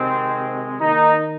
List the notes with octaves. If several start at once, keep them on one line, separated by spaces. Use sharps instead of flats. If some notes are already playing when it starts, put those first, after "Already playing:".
Already playing: C3 D#3 G#3 C4
D#3 A#3 D#4